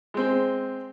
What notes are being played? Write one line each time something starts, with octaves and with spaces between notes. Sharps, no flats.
G#3 C4